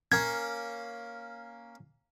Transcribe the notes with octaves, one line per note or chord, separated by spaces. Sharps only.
A#3 C#4 G#6